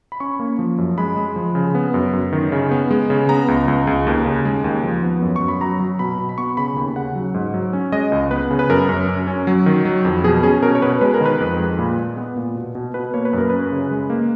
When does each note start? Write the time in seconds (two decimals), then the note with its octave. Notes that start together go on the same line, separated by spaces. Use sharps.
0.12 B5
0.20 C#4 C#6
0.39 A#3
0.59 F3
0.78 F#2
0.98 G#3 B5
1.16 G#3
1.36 F3
1.55 C#3
1.75 B3
1.94 F#2
2.13 F#2
2.33 D#3
2.52 C#3
2.71 B3
2.91 G#3
3.10 C#3
3.29 B3 A#5
3.48 C#2
3.68 C#2
3.87 C#2
4.07 D#2
4.26 C#3
4.45 G#3
4.64 D#2
4.84 F3
5.03 B3
5.22 F#2
5.36 C#6
5.41 F#2
5.48 B5
5.61 F#3 A#5
5.80 F#3
5.99 B2 B5
6.19 B2
6.29 B5
6.38 B3 C#6
6.57 C#3 B5
6.76 D#2
6.96 C#3 F#5
7.15 F#3
7.34 G#2
7.54 F#3
7.73 C#4
7.92 G#3 D#5
8.12 C#2
8.31 B3 B4
8.51 C#3
8.59 B4
8.69 F#2 A#4
8.89 F#2
9.08 F#2
9.27 C#4
9.47 F#3
9.66 D#3
9.85 F#3
10.05 F2
10.24 B2 G#4
10.43 C#4 G#4
10.62 B2 A#4
10.75 C#5
10.82 B2 B4
11.01 G#3 B4
11.14 A#4
11.21 D#3 B4
11.40 F2
11.59 G#3
11.79 A#2
11.98 G#3
12.17 B3
12.36 A#2
12.56 B2
12.75 B2
12.94 B2 B4
13.14 A#3 C#5
13.25 B4
13.33 F#2 A#4
13.50 C#4 B4
13.72 C#3
13.91 G#3
14.10 A#3